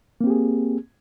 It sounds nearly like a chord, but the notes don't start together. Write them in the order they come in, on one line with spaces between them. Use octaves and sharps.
A#3 C4 G4 G#4